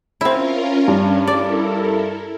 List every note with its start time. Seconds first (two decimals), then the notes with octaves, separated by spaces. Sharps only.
0.21 C4 C#4 E4 F4 A#4
0.88 G2 C#4 D4
1.27 E4 A4 A#4 D5